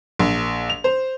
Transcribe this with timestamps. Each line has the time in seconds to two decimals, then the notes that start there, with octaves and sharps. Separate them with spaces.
0.19 A#1
0.70 F7
0.84 C5